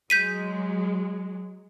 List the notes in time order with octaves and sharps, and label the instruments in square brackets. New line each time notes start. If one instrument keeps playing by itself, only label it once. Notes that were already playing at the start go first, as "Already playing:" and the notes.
[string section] F#3 G#3 [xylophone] G6 B6 D#7